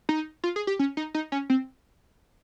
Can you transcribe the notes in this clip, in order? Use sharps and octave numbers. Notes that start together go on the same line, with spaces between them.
D#4
F4
G#4
G4
C#4
D#4
D#4
C#4
C4